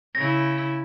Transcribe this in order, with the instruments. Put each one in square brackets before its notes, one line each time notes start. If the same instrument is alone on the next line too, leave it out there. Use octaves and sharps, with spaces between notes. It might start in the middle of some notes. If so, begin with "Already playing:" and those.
[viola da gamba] C#3 E4 [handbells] A#6